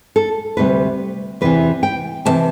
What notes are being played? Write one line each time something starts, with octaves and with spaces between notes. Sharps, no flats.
A4
D2 C3 G3 B4
E2 C3 E3 B4
G5
E2 C3 E3 A5